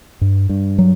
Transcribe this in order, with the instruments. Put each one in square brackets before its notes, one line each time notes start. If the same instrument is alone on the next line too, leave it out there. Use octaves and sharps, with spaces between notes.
[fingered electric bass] G2
G2
F#3